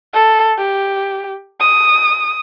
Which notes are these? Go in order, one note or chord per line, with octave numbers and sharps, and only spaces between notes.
A4
G4
D#6